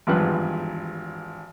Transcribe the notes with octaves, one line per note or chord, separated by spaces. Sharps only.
G#1 E2 G2 F3 B4 F#6